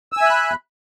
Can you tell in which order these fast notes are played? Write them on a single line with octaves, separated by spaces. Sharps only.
E6 G#5 E5 F#6 B5